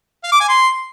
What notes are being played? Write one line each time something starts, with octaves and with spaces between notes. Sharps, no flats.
F5
D6
G#5
C6